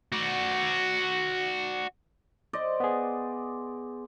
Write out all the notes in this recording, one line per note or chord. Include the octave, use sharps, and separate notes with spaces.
F#4 D5
C5 D5 D#5
B3 G#4